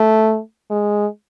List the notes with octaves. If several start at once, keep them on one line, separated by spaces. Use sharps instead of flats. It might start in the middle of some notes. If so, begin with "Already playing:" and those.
Already playing: A3
G#3